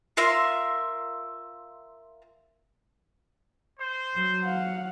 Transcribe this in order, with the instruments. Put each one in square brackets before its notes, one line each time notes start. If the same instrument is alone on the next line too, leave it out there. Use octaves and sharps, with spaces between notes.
[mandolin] F4 A#4 E5 C6
[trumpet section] C5
[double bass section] F#3
[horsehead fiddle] F5 F#5